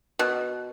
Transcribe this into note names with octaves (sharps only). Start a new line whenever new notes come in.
B2